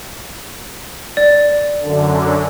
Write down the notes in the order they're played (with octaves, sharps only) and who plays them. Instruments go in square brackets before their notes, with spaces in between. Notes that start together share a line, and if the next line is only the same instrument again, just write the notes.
[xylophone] D5
[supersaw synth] F#2 D3